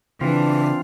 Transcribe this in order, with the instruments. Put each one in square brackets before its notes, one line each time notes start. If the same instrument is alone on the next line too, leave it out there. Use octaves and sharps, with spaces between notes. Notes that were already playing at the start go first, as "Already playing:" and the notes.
[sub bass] C#3 [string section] E3 [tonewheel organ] C4 F4 [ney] D4